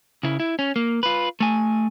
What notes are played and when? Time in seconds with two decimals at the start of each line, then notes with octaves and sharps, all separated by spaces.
0.23 C#3 E4
0.40 E4
0.59 C#4
0.76 A#3
1.03 F4 B4
1.40 A3 G#5